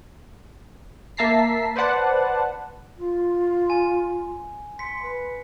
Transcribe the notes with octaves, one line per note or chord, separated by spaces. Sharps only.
A#3 E5 A5 A#5 B6 C7
B4 C5 D5 F#5 A5
F4
G#5
C6 B6 C#7
B4